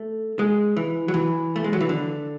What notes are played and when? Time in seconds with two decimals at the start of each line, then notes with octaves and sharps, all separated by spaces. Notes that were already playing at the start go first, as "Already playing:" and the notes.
Already playing: A3
0.39 G#3
0.77 E3
1.08 F#3
1.14 E3
1.56 A3
1.64 G#3
1.73 F#3
1.81 E3
1.89 D3